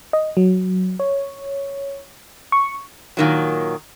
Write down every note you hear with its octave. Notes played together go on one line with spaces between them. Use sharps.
D#5
F#3
C#5
C#6
A#2 D#3 F#3